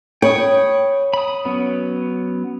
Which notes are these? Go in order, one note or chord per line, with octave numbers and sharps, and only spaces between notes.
C#5 G5 B5 D#6
B5 D#6
F#3 B3 C#4